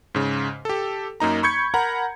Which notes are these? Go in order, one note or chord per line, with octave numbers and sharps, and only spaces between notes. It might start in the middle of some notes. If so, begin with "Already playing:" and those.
G#2 C#3
G4 A4
F#2 A#3 D#4 A#5
B5 C#6 G6 G#6 C#7
A#4 F#5 A#5 B5